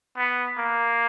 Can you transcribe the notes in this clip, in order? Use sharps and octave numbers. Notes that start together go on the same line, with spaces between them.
B3
A#3